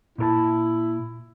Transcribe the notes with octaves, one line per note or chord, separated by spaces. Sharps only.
A#2 E4 A#4 A5